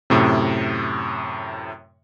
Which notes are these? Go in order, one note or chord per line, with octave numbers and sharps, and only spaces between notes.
F#2 A2 C3